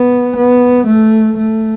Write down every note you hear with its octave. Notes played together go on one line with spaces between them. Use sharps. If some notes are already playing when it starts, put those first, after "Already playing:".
Already playing: B3
B3
A3
A3